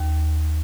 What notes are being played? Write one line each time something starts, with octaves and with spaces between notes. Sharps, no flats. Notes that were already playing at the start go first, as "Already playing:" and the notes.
Already playing: D#2